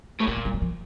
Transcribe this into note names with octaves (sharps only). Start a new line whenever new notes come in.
A2
A#2 A3
A#3
G3
F#3
F3